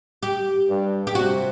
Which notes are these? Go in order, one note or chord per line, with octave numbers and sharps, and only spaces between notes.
G4
G2
G4
C3 F#4